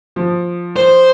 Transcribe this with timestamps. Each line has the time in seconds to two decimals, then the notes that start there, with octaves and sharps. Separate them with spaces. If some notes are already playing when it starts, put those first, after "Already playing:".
0.16 F3
0.76 C5